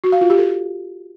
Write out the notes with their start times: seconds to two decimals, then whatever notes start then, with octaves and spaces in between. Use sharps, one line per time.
0.04 F#4
0.12 F5
0.21 F4
0.30 G4
0.39 A4